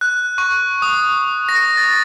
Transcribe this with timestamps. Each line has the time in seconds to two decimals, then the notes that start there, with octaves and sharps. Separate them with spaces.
0.01 F#6
0.38 C#6
0.82 D#6
1.49 A#6
1.77 A6